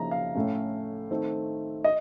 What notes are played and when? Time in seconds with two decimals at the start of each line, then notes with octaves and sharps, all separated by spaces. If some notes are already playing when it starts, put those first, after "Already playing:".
Already playing: C#3 F3 A#3 D#4 A#5
0.11 F5
0.35 A2 A3 C#4
1.11 D#3 A3 C4
1.84 D#5